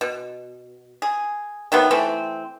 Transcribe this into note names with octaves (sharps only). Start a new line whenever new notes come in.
B2
G#4
C3 D#3 F#3 B3
E3 A3 C4